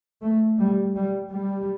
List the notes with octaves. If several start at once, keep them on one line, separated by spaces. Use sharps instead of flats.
A3
G3
G3
G3